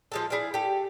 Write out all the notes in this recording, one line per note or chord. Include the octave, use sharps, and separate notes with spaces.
F3 G#3 A4
E4 G#4 D5 F5
G4 A4